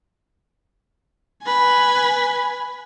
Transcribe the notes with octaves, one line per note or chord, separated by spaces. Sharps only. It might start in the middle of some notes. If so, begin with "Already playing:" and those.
B4 G#5